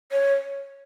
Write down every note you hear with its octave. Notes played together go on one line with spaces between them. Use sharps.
C#5